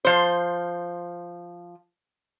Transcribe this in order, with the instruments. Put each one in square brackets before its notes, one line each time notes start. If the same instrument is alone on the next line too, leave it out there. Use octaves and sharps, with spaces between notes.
[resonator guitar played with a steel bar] F3 C5